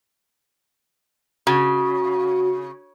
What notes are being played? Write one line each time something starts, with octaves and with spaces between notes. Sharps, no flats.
C#3 F#4